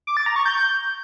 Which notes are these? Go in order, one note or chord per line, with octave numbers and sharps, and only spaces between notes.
D6
A6
A#5
C#6
G6